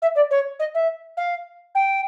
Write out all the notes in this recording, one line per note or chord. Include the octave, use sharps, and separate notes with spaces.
E5
D5
C#5
D#5
E5
F5
G5